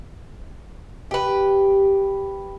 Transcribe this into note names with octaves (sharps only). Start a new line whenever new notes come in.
G4 B4